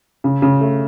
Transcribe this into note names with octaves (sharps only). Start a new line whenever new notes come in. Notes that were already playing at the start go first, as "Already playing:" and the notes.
C#3
C#3
A3